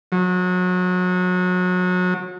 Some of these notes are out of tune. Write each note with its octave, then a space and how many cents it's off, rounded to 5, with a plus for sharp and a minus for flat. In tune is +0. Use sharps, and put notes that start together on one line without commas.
F#3 -30